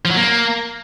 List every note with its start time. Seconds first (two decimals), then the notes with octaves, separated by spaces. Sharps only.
0.05 F3
0.11 F#3
0.17 A#3